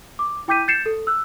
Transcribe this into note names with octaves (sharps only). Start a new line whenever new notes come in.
D6
E4 G5 D6 G6 B6 D#7
G6 A6 C7 C#7 E7
A4
E6 F#6